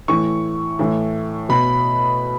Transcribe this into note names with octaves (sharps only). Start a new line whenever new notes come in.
A2 E3 C#6
A2 E3
B2 B5